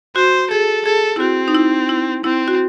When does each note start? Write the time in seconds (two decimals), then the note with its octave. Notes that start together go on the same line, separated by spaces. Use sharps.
0.16 F#4 C5
0.51 G#4 A4
0.85 G#4 A4
1.16 E4
1.20 C4 F#4
1.48 D#4
1.55 E4
1.89 E4
2.24 C4 E4
2.48 F#4